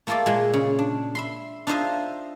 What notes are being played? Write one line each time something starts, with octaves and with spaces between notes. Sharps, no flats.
A3 A#3 F4 A4 A#4 D5
A#2 G#3
C#3
D4
E5 B5 C6
D4 D#4 F4 C5 D#5 E5